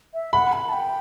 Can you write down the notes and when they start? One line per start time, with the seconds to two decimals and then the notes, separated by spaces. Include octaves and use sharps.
0.14 E5
0.33 F#5 B5
0.53 B5
0.69 A5
0.73 G5